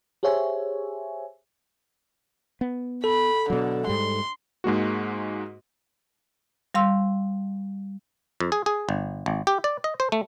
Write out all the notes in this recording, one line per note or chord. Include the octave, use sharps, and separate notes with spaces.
G4 G#4 C5 C#5 E5 G#5
B3
A4 B5
B2 D3 F#3
G#2 G3 C6
G#2 G#3 A#3 F#4
G3 F5 C6 E6
F2
G#4
G#4
G1
G#1
G4
D5
D#5
C5
A3